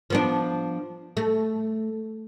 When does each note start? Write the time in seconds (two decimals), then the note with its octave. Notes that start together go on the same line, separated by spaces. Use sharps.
0.10 F3 B3 D4
1.17 A3